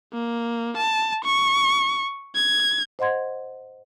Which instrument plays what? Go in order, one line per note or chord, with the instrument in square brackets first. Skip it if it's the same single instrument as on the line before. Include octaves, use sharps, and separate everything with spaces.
[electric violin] A#3
A5
C#6
G#6
[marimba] C5 D#5 F#5 C6 G#6